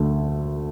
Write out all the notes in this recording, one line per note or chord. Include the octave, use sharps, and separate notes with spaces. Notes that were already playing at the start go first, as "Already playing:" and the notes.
Already playing: D2 D3 A3